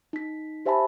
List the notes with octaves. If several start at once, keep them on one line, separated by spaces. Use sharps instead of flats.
D#4 B6
G4 C5 E5 G#5 A5 B5